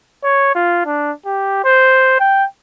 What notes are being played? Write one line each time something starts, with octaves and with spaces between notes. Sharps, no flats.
C#5
F4
D4
G4
C5
G5